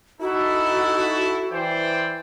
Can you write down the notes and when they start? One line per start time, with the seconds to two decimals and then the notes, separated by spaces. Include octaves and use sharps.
0.21 D#4 E4 F#4 A4
1.51 E3 C5 D5 G5